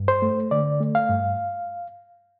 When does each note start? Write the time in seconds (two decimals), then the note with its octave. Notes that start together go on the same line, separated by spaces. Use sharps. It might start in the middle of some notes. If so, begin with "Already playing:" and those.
Already playing: G2
0.08 C5
0.22 A3
0.51 D3 D5
0.81 A3
0.95 F5
1.09 G2